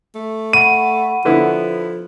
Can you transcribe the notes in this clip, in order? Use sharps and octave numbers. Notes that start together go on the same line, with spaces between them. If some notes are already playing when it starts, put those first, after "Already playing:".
A3
F#5 B5 C#6 D#7
D3 F3 B3 E4